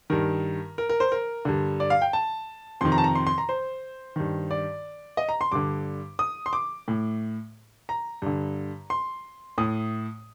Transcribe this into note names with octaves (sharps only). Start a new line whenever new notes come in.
G2 D#3 A#4
A#4
A#4
C5
A#4
G2 D3
D5
F5
G5
A5
F2 C3 D#3 C6
A#5
A5
A#5
C6
C6
A#5
C5
G2 D#3
D5
D#5
A#5
C6
G2 D3 D6
D#6
C6
D6
A2
A#5
G2 D3
C6
A2 D#6